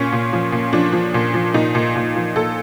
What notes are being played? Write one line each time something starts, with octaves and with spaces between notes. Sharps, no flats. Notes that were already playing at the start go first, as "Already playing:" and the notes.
Already playing: A#2 C#4
A#2
F3
A#2
F3 D4
F3
A#2
F3
A#2 D#4
A#2
A#2
F3
A#2 A4